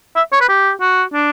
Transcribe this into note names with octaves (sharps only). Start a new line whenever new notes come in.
E5
C#5
B4
G4
F#4
D4